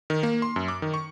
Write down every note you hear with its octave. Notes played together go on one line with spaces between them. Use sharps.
D#3
A#3
C6
F#2
D6
D#3
C#6